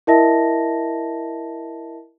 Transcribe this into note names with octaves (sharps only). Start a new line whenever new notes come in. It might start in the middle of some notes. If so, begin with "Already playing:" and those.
E4 A#4 D#5 E5 A5 A#6